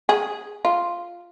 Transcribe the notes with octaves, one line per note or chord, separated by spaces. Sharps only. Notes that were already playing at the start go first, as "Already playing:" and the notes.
G#4
F4